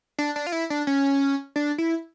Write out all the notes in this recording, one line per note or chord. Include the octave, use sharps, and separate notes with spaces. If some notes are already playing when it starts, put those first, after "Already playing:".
D4
D4
F4
E4
D4
C#4
D4
E4